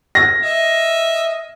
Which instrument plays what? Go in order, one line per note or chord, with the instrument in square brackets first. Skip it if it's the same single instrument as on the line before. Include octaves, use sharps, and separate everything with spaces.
[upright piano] A#6
[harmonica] D#5 E5